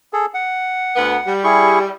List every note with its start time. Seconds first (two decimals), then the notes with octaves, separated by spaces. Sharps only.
0.13 G#4 A4
0.34 F#5
0.95 D2 B3
1.26 G3
1.44 E4 G#4 C#6